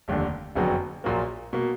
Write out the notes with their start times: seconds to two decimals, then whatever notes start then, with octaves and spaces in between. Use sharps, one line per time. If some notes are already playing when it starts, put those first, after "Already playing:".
0.08 F1 D#2 D3
0.55 F#1 F2 D3 F#3 B3
1.04 A#1 A#2 F#3 A#3
1.53 B2 A#3